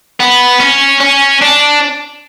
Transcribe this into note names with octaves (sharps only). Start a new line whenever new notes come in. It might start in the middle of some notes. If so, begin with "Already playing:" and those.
B3
C#4
C#4
D4